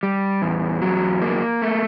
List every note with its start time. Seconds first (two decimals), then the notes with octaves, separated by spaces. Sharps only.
0.03 G3
0.42 E2
0.82 F#3
1.22 A#3
1.62 A3